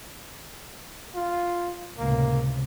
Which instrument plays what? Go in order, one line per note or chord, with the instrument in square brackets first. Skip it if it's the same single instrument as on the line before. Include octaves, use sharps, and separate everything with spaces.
[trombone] F4
[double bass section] C#2 A2 C3 [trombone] A#3